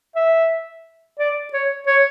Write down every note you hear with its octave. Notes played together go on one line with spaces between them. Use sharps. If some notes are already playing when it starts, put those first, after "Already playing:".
E5
D5
C#5
C#5